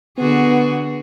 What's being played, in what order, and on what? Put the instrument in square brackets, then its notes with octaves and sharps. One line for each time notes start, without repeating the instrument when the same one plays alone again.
[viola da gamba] D3 F#4 G#4 [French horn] B3